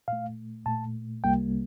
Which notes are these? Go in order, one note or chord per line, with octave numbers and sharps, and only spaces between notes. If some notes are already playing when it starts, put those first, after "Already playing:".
A#2 A3 F5
A#2 A3 A5
C2 C3 G3 A#3 G5